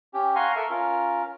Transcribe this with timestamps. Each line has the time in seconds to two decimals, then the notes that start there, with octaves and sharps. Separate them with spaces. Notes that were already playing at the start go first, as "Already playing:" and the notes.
0.14 C#4 G4
0.36 F5 F#5 G#5 A#5 C6 C#6
0.56 A4 A#4 E5
0.70 C#4 F4 A#4